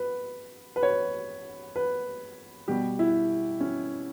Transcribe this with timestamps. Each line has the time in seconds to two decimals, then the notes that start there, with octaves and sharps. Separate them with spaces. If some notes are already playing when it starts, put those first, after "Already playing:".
Already playing: B4
0.76 B4
0.83 C#5
1.76 B4
2.68 B2 G3 G4
2.99 E4
3.60 C#4